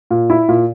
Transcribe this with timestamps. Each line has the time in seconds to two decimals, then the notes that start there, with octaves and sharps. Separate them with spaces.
0.11 A#2
0.30 E4
0.49 A#2